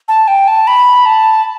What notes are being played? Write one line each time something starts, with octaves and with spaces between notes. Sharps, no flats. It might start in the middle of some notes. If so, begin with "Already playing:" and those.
A5
G5
A5
B5
A5